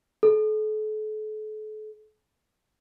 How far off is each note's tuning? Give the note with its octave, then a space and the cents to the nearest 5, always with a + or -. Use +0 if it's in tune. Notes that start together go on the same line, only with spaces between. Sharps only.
A4 -40